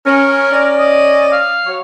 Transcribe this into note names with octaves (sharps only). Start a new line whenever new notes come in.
C#4 A#4
C#4 D5
D#5
F5
F#3 C#5